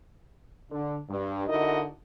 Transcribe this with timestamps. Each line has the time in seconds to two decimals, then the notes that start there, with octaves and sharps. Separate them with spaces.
0.71 D3
1.10 G2
1.48 D3 D#4 E4 F#4 A#4 D#5